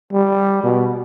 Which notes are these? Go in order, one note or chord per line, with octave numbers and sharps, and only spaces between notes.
G3
B2